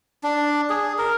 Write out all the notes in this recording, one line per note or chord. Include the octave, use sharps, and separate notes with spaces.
D4
G#4
A#4